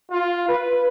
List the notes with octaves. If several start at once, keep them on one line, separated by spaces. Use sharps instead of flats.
F4
B4